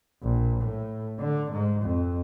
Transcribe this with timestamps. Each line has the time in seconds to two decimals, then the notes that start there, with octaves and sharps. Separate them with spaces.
0.23 A#1
0.60 A2
1.19 D3
1.52 G#2
1.82 F2